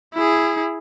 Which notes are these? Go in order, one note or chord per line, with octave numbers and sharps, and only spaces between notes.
E4 G#4